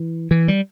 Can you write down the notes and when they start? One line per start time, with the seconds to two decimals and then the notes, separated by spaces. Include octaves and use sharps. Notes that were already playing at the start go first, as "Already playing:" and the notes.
Already playing: E3
0.31 E3
0.48 G3